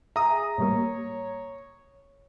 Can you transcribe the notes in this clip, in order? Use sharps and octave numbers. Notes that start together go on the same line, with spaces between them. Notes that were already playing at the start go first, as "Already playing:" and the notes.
G#4 E5 A#5 D#6
A2 G3 A#3 C#5